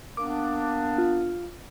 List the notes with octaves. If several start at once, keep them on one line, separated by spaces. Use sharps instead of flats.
A#3 B3 D4 D6
F4